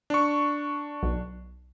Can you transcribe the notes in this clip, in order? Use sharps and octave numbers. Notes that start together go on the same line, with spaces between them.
D4 C#6
B1